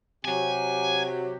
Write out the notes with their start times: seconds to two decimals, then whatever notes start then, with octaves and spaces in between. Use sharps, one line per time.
0.25 C3 F#3 G4 G#5